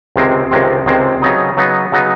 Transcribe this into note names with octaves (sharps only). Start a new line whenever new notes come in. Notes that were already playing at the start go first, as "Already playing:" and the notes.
C#2 C3 D#3 G#3 C4
C#2 C3 D#3 G#3 C4
C#2 C3 D#3 G#3 C4
C#3 F#3 B3 D#4
C#3 F#3 B3 D#4
C#3 F#3 B3 D#4